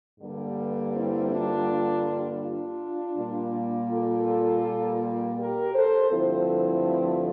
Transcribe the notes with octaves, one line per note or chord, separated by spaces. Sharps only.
G2 D3 G3 A#3
C4 E4
D4 F4
D4 F4
A#2 G3 A#3
F4 A4
G4 A#4
A4 C5
G2 D3 F3 A3 C4 E4